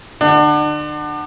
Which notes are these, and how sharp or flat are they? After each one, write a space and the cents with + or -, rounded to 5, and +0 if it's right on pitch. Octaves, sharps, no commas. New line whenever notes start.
D3 +30 D4 +35